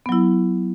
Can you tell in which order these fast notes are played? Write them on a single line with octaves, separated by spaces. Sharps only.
B3 F#3 E4